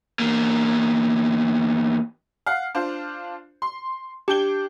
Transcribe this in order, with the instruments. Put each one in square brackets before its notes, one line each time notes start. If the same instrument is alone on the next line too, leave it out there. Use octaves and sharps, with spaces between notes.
[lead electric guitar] E2 A#3
[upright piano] F5 F#5
D4 F4 C5
C6
[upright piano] D4 G5 G7 [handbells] G4